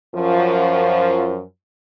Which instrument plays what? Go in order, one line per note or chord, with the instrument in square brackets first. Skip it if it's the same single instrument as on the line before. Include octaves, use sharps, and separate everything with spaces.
[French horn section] F#2 F3